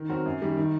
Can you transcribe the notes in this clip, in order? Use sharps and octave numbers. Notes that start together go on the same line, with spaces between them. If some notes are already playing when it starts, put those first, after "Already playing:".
Already playing: D#3
F#3 C4 F#4 A#4
F#2
D#3 G3
D#3